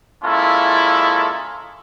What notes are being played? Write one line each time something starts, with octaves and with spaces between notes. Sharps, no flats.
G#3 A#3 C#4 E4 F4 A4